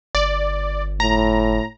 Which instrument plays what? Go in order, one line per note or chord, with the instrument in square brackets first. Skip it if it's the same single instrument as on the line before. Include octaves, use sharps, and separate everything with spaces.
[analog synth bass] G1 [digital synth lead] D5
[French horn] A2 [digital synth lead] A#5